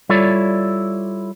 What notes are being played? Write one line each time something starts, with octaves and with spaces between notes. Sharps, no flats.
G3 E4 F4 A4 C#5 D5